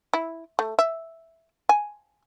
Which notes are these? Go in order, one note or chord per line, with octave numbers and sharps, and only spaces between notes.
E4
A3
E5
G#5